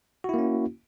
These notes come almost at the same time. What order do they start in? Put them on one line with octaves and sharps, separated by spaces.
F#4 E4 A#3 C#4